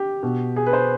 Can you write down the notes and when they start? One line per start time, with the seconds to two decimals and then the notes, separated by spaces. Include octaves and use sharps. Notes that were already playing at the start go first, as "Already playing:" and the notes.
Already playing: G4
0.23 B2
0.56 G#4
0.66 B4
0.73 C5